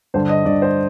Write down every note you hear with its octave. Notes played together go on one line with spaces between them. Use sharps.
G2 D3 C5
D#5
G2 D3 D5
C5